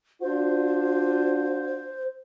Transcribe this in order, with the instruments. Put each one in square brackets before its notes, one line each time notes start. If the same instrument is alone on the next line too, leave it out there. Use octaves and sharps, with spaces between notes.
[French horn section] D4 F4 F#4 [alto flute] C5